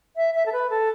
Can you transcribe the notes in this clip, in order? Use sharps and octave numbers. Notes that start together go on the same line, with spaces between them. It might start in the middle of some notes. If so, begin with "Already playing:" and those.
E5
E5
A4
B4
A4